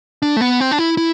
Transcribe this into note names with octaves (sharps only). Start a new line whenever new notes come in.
D4
A3
B3
C4
D4
E4
E4